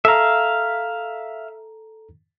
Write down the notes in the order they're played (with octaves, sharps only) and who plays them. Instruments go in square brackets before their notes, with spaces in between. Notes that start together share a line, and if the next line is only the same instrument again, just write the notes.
[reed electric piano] A4 A#5 [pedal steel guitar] E5 F5